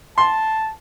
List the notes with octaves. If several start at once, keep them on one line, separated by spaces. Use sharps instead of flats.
A5 C6